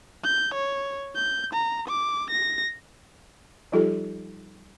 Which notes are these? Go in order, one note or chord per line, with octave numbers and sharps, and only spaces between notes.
G6
C#5
G6
A#5
D6
A#6
F3 G3 D#4 F4 G4 A4